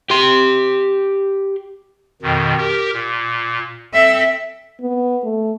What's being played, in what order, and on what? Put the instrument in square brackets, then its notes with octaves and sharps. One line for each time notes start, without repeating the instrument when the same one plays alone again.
[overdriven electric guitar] G4 C6
[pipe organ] F2 B2 D#3
G4 A#4
A#2
[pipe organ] C4 A4 [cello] E5
[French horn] B3
A3